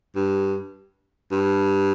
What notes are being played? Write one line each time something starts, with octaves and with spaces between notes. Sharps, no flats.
G2
G2